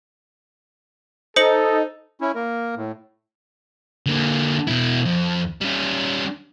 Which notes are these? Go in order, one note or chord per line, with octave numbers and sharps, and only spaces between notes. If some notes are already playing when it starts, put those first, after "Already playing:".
D#4 A4 C5 C#7 F#7
C#4 E4
A#3 A#4
A2
D3 A#3
B2 E4
F2
G3 C#4